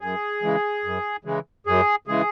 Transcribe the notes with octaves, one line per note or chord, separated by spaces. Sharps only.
F#2 G#4
C#3 E3 G#3
F#2
C#3 E3 G#3
F#2 G#4
C#3 E3 G#3 G#4